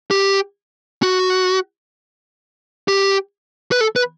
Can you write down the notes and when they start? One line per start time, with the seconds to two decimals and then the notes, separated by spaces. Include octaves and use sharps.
0.11 G4
1.03 F#4
2.88 G4
3.72 B4
3.81 A4
3.96 B4